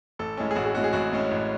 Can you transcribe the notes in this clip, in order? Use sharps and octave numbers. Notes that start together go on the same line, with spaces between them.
A1 A4
A2 G#3 C#4
G#4
A1 F#4
G#4
A2 G#3 C#4 F#4
G#4
A1 F#4
A2 G#3 C#4
A1